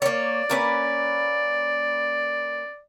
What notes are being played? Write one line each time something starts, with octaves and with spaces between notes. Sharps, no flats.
A#3 C#5 D5
A#3 C#4 B4